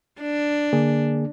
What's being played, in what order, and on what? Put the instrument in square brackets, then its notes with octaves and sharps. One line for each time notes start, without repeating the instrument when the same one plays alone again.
[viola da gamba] D4
[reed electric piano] D3 A#3 G#4